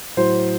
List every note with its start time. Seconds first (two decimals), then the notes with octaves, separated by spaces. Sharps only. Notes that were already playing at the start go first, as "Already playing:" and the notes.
0.17 A2 F#3 C5